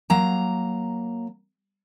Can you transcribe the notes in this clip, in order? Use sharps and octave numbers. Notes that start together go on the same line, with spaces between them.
F#3 A#3 A#5